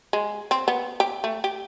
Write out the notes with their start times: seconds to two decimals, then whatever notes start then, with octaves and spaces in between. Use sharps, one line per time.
0.13 G#3
0.51 C4
0.68 B3
1.00 G4
1.24 A3
1.44 G4